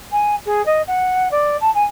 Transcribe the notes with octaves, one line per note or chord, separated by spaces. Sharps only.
G#5
G#4
D#5
F#5
D5
A5
G#5